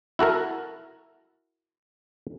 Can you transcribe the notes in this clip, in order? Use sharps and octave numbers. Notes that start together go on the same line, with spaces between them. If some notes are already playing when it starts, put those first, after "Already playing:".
E4 F#4 A4 A#4